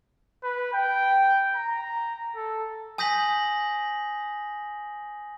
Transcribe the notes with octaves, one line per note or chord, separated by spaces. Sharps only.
B4
G5
A#5
A4
G#5 D#6 G6 A#6 B6 F#7